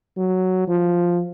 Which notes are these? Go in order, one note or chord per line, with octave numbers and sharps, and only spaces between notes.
F#3
F3